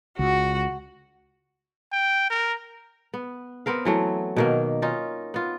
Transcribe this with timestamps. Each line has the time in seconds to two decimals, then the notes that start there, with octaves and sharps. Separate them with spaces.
0.19 C#2 F#4
1.92 G5
2.30 A#4
3.14 B3
3.66 B3 C4 A#4 F5
3.85 E3 F#3 A3
4.36 B2 D#3 A#3
4.82 C#4 D#4 F4
5.34 B3 F4